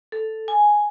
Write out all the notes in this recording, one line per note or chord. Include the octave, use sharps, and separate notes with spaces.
A4
G#5